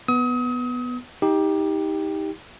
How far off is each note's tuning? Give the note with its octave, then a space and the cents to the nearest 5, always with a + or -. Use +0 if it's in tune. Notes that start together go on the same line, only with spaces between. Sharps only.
B3 +0 D#6 +35
D#4 +25 G4 +10